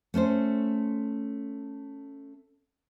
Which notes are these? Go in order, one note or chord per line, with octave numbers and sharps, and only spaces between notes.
A3 C#4 A4 C5